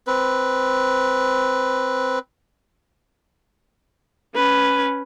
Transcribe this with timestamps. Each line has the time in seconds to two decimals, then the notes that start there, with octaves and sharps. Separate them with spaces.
0.07 C4 B4
4.35 C#4 B4